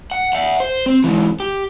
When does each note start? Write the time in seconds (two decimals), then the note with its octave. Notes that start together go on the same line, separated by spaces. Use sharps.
0.11 F#5
0.33 E5 F#5
0.60 C5
0.86 C4
1.04 G#2 E3
1.40 G4